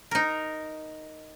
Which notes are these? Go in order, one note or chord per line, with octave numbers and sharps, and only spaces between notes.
D#4 A#4